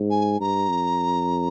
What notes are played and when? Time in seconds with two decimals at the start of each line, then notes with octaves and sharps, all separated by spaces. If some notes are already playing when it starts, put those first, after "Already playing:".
Already playing: G#2
0.10 G#5
0.40 G2 A#5
0.69 F2